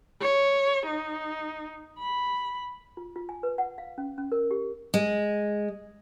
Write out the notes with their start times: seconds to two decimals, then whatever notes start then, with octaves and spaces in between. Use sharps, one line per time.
0.21 C#5
0.86 D#4
1.99 B5
2.97 F4
3.16 F4
3.29 G#5
3.43 B4
3.58 F#5
3.78 F5
3.98 C#4
4.18 C#4
4.32 A#4
4.51 G4
4.94 G#3